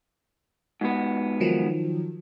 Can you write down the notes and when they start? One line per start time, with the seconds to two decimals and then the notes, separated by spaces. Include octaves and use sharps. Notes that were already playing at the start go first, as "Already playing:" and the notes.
0.81 G#2 B2 B3
1.40 D#3 F3 F#3